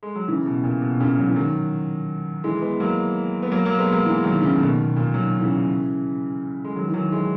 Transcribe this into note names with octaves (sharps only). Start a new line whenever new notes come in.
G#3
F#3
C#3 E3
B2
A#2
B2
A#2 C#3
F#3
E3
D#3 F#3
E3 G#3
G#3 B3
F#3 A#3
B3
F#3 A#3
F#3 A#3
G#3 B3
F#3 A#3
E3 G#3
D#3 F#3
C#3 E3
B2 D#3
B2
A#2
D#3 F#3
C#3 E3
G#3
D#3 F#3
E3
D#3 F#3
E3 G#3